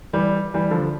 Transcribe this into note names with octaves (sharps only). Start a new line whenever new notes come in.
E3 G3
E3 G3
D3 F3